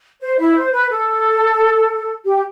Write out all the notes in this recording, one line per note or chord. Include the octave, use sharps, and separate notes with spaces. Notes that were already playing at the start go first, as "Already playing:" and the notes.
C5
E4 E5
C5
B4
A4
G4